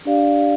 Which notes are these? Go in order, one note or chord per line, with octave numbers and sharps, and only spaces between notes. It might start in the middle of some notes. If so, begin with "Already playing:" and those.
D4 G4 D5 F5